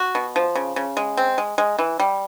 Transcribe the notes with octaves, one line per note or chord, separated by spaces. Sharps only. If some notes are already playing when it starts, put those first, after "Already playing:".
Already playing: F#4
B2
F3
C#3
C#3
G#3
C4
G#3
G#3
E3
G3